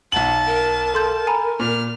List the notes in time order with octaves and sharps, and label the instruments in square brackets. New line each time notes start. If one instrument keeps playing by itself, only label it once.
[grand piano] B1 F#7 [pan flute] F#5 [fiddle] A5
[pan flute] A#4
[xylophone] A4 C6 G6
G#5 A#5 B5
[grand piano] A#2 [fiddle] F6